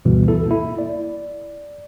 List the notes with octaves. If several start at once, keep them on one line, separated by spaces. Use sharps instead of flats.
D2 G2 B2 E3 G3
E4 A4
A#3 E4
D5